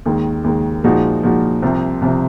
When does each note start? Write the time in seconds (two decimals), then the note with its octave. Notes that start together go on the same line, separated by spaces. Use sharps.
0.06 D#2 D#3 G#3
0.44 D#2 D#3 G#3
0.84 A#2 F3 G#3 D#4 F#4
1.23 A#2 F3 G#3 D#4 F#4
1.62 C2 C3 F3 C4
2.02 C2 C3 F3 C4